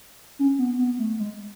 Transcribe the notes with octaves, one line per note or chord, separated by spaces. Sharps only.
C#4
B3
B3
A3
G#3